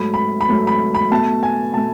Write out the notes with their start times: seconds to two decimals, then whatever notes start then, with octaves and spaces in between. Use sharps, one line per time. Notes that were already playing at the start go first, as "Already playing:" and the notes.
Already playing: G#2 F#3 A3 B5
0.14 B5
0.41 B5
0.48 G#2 F#3 A3
0.67 B5
0.95 B5
1.11 B2 A3 A5
1.43 G#5
1.73 B2 A3 A5